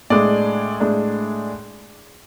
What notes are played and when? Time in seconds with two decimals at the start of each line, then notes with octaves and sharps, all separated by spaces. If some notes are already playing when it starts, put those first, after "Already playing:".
0.10 A2 G#3 D4 D5
0.80 A2 G#3 D4